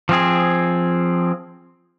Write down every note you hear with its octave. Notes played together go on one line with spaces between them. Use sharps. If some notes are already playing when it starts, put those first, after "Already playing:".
F3 C4 G#4